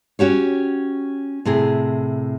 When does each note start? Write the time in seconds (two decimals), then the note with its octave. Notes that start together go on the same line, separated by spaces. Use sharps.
0.19 C#4 F#4 G4 C#5
1.45 A2 C3 G#4